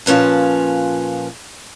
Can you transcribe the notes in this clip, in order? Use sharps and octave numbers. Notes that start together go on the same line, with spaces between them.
A#2 F3 C#4 B4 A5